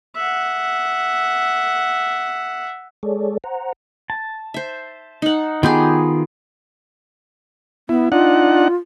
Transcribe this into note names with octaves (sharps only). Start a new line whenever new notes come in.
E5 F#5
G#3 G#4 A4 C#5 D5
C5 F#5 A#5
A5
C5 E5
D#4 F#5
D#3 B3 F4 G4 G#4 G6
B3 E4
D4 D#4 F4 F#5